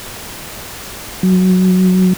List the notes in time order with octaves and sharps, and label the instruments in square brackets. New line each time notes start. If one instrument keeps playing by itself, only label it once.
[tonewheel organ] F#3